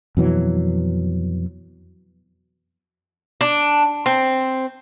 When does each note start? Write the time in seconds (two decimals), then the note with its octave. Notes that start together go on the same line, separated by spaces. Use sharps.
0.17 F2 B2 E3 F#3
3.41 D4
4.06 C4